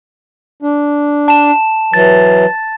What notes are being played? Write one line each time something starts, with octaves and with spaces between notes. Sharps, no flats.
D4
A5 E7
E3 F#3 A6